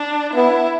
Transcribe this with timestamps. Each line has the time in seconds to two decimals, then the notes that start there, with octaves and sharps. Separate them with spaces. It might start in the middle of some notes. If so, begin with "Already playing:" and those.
Already playing: D4
0.34 B3 E4